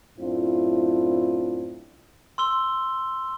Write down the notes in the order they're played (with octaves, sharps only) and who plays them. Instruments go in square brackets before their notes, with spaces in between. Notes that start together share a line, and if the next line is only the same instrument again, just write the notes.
[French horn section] F#2 A2 C4 D4 E4 F4
[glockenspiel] C6 E6 G7